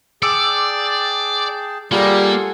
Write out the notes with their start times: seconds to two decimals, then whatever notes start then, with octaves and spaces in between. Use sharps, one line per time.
0.22 G#4 D5 G5 A5 D6 E6 C#7
1.92 G3 A#3 F4 G#4 A4 F#5 G#5